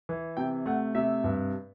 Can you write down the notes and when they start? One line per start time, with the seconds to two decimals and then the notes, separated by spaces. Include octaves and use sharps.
0.09 E3
0.37 C3 G5
0.66 A3 F#5
0.95 C3 E5
1.24 G2